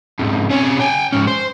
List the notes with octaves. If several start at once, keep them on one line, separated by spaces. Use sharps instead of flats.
F2 G#2
C3 C#4
G5 G#5
G#2 C#4
C5